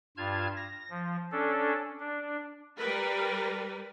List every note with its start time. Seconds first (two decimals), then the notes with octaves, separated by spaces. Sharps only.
0.17 G2 F4 A5 F6 G#6
0.56 A#6
0.90 F3
1.32 C#4 D4 A4
2.00 D4
2.78 G3 A#4 B4